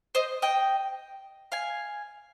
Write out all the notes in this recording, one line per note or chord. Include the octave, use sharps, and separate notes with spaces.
C5 D#5
D#5 G5
F5 G#5